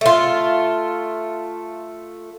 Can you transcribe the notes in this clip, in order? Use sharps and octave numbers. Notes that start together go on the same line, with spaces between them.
A3 F4